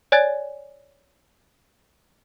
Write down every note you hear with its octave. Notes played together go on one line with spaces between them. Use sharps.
C#5 D5 G#5 F#6 G#6 A6